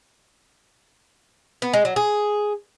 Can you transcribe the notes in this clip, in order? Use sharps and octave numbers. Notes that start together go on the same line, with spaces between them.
B3
G#3
F#3
G#4